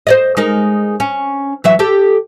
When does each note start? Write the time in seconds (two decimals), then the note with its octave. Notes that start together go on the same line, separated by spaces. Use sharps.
0.07 C5 D5 D#5
0.37 G#3 D#4 A#4
1.00 C#4
1.64 E3 F#3 E5
1.79 G4 A4